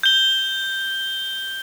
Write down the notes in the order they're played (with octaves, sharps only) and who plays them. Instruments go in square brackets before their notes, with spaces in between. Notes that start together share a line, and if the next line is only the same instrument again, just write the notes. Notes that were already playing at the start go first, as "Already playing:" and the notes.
[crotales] G6 G7